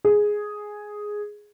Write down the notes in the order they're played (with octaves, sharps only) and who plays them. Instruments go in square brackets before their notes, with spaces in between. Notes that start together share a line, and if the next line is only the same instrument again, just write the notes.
[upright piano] G#4